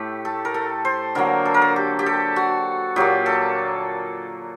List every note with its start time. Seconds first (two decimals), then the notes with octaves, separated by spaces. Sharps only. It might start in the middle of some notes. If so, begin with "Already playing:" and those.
Already playing: A2 A3 G4
0.25 A4
0.45 A#4
0.54 A4
0.85 C5
1.15 D3 F#3 A#3 A#4
1.45 A4
1.54 A#4
1.62 A4
1.76 G4
1.99 G4
2.06 A4
2.36 F#4
2.96 A#2 F#3 A#3 G4
3.26 A4